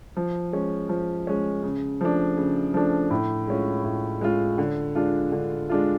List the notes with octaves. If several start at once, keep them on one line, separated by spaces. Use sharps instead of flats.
F3
G#3 C#4
F3
G#3 C#4
C#3
F3 A3 D4
C#3
F3 A3 D4
A2
G#3 C#4 F4
A2
G#3 C#4 F4
D3
G#3 D4 F4
D3
G#3 D4 F4